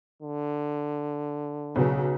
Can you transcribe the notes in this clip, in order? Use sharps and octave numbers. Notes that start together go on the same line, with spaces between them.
D3
B1 C#3 F#3 B3